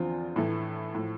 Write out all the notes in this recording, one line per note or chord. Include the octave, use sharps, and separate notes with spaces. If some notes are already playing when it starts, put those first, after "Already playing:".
Already playing: E2 D3 F3 C4 F4
A2 E3 A3
A2 F3